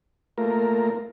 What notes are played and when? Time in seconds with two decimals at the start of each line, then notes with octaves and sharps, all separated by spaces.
0.38 A3 A#3 F4 A#4